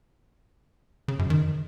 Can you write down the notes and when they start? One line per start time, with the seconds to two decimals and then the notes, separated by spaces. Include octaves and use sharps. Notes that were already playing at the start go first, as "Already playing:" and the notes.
1.08 C#3
1.19 F#2
1.30 D#3